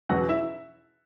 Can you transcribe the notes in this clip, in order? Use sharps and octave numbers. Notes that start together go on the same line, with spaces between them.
E2 B2 F#3 C#4 F#4 F#5
E4 E5